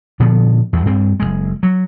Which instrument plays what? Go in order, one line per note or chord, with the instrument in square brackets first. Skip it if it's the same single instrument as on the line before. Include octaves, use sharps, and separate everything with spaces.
[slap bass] A#2 D3 F3 B3
E2 G2
G2 C4
F#1 D#2 G#3
F#3